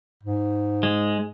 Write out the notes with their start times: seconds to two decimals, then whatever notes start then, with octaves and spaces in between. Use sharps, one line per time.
0.23 G#2
0.83 G#3